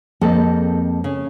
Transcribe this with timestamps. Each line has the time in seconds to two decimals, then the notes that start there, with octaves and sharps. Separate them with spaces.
0.21 F2 G#3 A#3 C4 A4
1.04 C#3